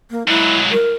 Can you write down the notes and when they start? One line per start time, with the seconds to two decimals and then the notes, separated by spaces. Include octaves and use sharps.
0.11 A#3
0.28 G#2 F#3 E4
0.72 A#4